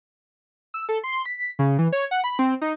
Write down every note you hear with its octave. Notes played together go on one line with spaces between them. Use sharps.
E6
A4
C6
B6
C#3
E3
C#5
F#5
B5
C4
D#4